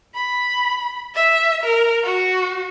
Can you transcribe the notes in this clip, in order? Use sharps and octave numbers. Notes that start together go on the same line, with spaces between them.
B5
E5
A#4
F#4